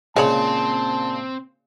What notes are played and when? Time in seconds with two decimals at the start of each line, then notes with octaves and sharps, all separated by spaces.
0.16 A#2 C#3 G#3 C4 C5 C#5 A5 B5